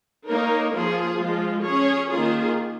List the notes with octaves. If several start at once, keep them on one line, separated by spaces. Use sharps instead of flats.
A#3 D#4 A#4 C#5
F3 A#3 F4 G#4
F3 G#3 F4
C#4 G#4 C#5
D#3 A#3 F4 G#4